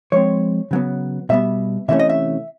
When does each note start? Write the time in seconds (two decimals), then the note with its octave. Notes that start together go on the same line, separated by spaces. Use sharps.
0.12 F3 G#3 C4 C#5
0.71 C#3 F#3 B3
1.29 B2 G3 B3 E5
1.88 C3 E3 A3 C#4 E5
1.99 D#5
2.09 E5